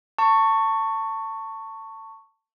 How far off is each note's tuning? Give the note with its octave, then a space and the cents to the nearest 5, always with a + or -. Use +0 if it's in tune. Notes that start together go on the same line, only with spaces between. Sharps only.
A5 +25 C#6 +0